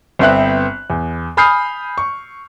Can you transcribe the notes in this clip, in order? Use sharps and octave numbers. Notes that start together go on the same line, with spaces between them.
G1 B3 C4 C5 E5 F#6
E2
G#5 B5 D#6 F6 G6 C7
C#6